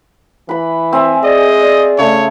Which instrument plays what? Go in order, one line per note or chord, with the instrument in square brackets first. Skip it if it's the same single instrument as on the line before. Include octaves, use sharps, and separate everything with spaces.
[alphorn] E3 [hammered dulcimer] B4 B5
[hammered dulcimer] C4 E5 [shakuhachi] G#5
[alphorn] G#4 [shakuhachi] D5 [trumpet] D#5
[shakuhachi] D5
[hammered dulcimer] C#3 A3 [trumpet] C#5